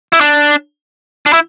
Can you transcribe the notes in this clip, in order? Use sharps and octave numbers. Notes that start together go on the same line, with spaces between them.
E4
D4
D4
E4